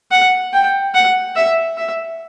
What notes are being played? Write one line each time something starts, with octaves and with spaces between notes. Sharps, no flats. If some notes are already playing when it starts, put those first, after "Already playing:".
F#5
G5
F#5
E5
E5